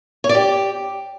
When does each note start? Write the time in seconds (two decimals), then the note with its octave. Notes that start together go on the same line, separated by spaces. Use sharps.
0.24 C#5
0.29 D5
0.35 G4